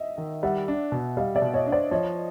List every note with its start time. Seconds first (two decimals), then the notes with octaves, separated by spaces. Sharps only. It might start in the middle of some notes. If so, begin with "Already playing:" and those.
Already playing: D#5 E5
0.18 D#3
0.43 G3 E5 F#5
0.68 D4
0.92 B2
1.17 G3 D#5 F5
1.35 D5 E5
1.42 B2
1.54 C#5 D#5
1.66 D4
1.72 C5 D5
1.91 F3 C#5 D#5